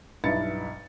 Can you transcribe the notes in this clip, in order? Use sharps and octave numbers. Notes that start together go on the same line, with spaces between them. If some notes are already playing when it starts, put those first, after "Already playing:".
B1 G2 E4 A6 C#7